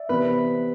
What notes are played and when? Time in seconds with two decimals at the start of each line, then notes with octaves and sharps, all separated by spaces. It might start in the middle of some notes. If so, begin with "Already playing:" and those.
Already playing: D5 E5
0.09 C3 E3 B3 E4 B4